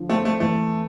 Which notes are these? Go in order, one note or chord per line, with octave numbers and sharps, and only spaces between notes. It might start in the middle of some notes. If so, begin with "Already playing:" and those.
Already playing: D3 F3
A3 C4
A3
E2 A3